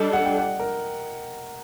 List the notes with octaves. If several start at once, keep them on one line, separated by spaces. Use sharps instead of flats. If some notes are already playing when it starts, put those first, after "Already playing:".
Already playing: G3 D4 A4 D#5
F#5
G5
F#5
A#4